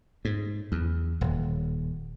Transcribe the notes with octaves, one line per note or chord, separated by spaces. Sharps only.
G#2
E2
D#1